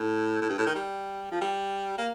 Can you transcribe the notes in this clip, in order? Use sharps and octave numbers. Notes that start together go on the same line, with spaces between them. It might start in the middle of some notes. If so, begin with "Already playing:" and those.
Already playing: A2
A2
G2
A2
D#3
G3
F3
G3
A#3